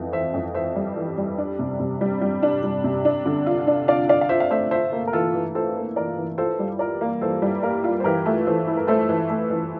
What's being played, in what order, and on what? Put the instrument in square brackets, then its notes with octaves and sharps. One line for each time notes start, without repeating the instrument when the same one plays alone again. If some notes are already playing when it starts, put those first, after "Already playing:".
Already playing: [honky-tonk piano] F2 E3
[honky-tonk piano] E3 [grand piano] C5 E5
[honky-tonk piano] F2
[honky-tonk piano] E3 [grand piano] C5 E5
[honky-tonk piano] G3
E3
G3
D4
C3
C3
G3
G3
D4
G3
C3
D4
D3
F4
D4
[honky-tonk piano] D4 [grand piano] D5 F5
[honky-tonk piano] D4 [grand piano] D5 F5
[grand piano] F5
[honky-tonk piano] F4 [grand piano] C5 E5
[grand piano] F5
[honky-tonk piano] A3 [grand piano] C5 E5
[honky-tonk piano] F4 [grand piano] C5 E5
[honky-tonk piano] A#3
[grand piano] A#4
[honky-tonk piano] E3 [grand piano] F4 A4
[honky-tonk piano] E3
[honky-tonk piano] F4 [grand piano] A4 C5
[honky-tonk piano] A#3
[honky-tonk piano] E3 [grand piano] A#4 D5
[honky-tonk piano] E3
[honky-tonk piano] F4 [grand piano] A4 C5
[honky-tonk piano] G3
[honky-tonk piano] F4 [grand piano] A#4 D5
[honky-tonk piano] A#3
[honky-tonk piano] E3 [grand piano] A4 C5
[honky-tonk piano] G3
[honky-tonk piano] A#3 [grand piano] G4 A#4
[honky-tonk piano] F4
[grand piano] C5
[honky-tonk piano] E3 [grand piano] G4 A#4
[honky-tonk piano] A3
[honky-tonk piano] E3 [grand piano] A4 C5
[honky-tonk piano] E4
[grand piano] A#4
[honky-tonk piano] A3 [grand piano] A4 C5
[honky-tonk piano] E3
A3
E3